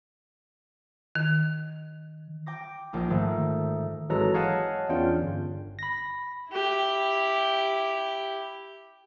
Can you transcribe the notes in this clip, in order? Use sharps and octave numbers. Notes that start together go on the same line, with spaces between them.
D#3
G5 D6 A#6
A#1 A#3 D#4
G#2 D#3 A3
G#1 E3 F#3 G#3 A4 A#5
C#5 D#5 F5 F#5 G#5 A5
E2 C#4 D4 F4 G5
G1
B5 A#6
E4 G4